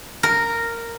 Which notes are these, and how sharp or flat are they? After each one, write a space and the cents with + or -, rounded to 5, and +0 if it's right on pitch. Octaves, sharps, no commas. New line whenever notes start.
A#4 -10